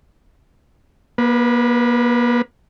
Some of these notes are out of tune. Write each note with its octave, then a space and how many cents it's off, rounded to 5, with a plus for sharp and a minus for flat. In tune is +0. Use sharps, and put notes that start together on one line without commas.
A#3 +40 B4 +0